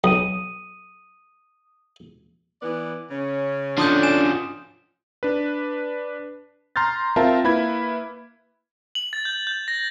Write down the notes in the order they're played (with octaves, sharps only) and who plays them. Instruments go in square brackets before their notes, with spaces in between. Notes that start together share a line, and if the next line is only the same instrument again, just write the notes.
[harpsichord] B1 [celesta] D#6 D#7
[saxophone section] E3 B3 D5
C#3 C#4
[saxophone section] D3 [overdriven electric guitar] F3 C#4 [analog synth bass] D4 [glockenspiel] C6 D#6 G6
[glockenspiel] G#5 E7
[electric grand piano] D4 B4
A#5 C6 F6 G6 A6
C4 F4 A#4 E5 F5 A5
A#3 E4 B4 B5 G#6
[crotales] F#7
A6
G6
G6
A#6